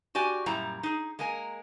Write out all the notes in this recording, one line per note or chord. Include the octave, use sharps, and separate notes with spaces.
F#4 G4 D5 G#5
F#2 A#2 G3 E4 A#5
D#4 G#4
G#3 A#3 A#4 G#5